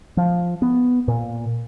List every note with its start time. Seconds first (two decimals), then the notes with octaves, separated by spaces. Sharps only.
0.17 F3
0.62 B3
1.08 A#2